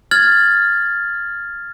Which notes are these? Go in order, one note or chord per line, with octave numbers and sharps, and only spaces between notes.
F6 G#6 A6 F#7